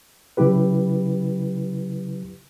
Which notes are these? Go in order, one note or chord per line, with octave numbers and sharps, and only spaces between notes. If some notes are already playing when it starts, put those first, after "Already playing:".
C#3 F#3 E4 G4 B4